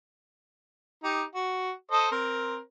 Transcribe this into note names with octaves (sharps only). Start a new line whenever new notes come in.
D#4 G4
F#4
A4 C5 D#5
C4 A#4